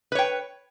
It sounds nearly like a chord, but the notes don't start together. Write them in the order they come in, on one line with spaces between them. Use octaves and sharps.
B4 C#5 G5